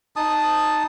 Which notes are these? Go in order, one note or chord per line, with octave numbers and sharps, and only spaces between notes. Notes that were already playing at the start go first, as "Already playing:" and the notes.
D#4 A5 D#6